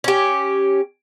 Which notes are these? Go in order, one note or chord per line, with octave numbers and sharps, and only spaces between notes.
C#4 G4